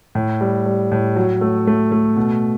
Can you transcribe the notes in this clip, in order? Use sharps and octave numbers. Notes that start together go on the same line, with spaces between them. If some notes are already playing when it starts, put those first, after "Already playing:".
A2
G3
G3
A2
F#3
A3
A3
A3
B2